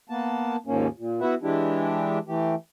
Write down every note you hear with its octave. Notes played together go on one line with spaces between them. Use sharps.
A#3 B3 A5
D#2 G#2 F3 A#3 C#4
A#2
B3 E4 F#4 B4 E5 F#5
E3 G#3 D4 E4 G4
E3 A3 G4